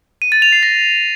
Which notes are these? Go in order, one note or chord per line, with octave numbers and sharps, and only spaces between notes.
D#7
A6
F7
C7
A#6